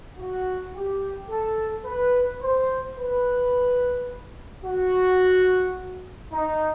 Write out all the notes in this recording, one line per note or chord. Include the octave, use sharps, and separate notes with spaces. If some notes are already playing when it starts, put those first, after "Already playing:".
F#4
G4
A4
B4
C5
B4
F#4
D#4